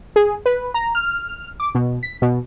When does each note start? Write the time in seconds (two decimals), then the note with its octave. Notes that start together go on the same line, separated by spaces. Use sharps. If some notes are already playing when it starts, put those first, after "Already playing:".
0.16 G#4
0.46 B4
0.74 A#5
0.95 F6
1.60 D6
1.75 B2
2.03 B6
2.22 B2